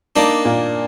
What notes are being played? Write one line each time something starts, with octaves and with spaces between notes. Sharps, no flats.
A#3 D4 D#4
A#2